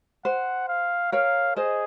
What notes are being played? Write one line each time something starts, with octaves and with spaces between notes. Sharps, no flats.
C5 F#5
F5
A#4 C#5 F5
G#4 C5 D#5